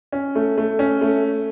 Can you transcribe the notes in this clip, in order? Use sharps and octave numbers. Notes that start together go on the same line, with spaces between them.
C#4
A3
A3
C#4
A3